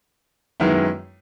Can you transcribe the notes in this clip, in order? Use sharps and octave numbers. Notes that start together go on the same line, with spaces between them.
F#2 D#3 G#3 B3 E4